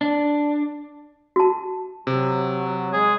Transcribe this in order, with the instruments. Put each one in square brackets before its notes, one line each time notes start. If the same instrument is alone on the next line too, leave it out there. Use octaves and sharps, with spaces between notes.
[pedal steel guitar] D4
[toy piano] F#4 A5
[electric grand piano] C3 [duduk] F#3
[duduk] G#3 [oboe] G#4